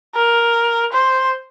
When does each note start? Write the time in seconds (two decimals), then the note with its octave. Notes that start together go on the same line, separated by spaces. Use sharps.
0.16 A#4
0.93 C5